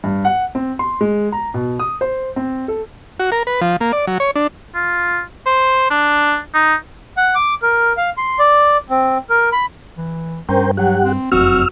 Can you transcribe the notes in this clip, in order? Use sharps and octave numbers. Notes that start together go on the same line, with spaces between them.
G2
F#5
C4
C6
G#3
A#5
B2
D#6
C5
C4
A4
F#4
A#4
B4
F3
A#3
D5
F#3
C#5
D4
F4
C5
D4
D#4
F#5
D6
A#4
F5
C6
D5
C4
A#4
B5
E3
G2 C#4 A#4 C5 G5
F#3 G4 F#5
C4
F1 F#2 C4 F#4 E6 F6